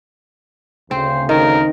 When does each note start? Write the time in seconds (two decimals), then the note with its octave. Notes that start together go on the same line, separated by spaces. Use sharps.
0.91 D2 C#3 C4 C5
1.29 D#3 A#4